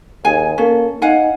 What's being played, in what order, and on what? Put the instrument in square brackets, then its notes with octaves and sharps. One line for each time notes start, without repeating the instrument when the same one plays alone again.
[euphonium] D#2 [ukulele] G#4 G#5
[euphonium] A#3 [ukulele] C#4 A4
[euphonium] D#4 [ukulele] F5 F#5 G#5